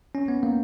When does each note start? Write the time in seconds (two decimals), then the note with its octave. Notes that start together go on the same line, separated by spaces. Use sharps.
0.15 C#4
0.28 B3
0.43 A#3